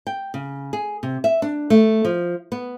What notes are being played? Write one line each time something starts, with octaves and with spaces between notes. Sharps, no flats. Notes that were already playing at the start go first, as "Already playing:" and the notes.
G5
C#3
G#4
C3
E5
D4
A3
F3
B3